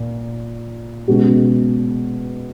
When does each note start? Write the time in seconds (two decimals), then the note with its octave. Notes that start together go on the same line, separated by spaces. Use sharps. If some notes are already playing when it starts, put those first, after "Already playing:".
Already playing: A#2
1.08 B2 G#3 C#4 F#4